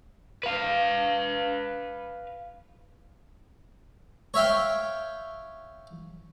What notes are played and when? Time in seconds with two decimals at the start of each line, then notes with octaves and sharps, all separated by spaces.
0.43 B4 F5
4.34 C#5 E5 F5 G5